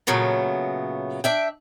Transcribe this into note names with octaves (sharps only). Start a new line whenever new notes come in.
A#2 C#3 F#3 A3 B3
D4 E5 G5